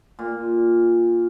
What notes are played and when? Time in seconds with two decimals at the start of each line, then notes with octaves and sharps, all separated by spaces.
0.19 A#2